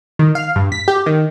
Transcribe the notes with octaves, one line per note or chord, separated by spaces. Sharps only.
D#3
F5
G2
B6
G4
D#3